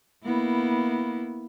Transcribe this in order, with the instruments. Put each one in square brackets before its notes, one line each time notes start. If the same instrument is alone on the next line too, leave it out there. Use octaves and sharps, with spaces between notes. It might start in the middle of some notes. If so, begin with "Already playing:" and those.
[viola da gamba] A#3 B3 E4